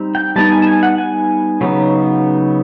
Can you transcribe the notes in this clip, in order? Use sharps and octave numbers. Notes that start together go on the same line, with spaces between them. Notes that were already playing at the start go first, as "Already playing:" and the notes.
Already playing: G3 C4 D#4
G5
G3 B3 D#4 A5
G#5
A5
G#5
F#5
G#5
C#3 F#3 B3 D#4